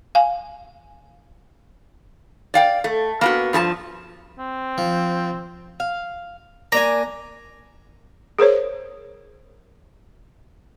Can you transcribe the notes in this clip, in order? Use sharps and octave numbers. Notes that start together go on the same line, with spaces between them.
F5 G#5
D5 F5 G5
A3
A#3 B3 F#4
G2 F3 F#4 A5
C4
F3
F5
A#3 D4 G#5 A#5
G#4 A#4 C5 C#5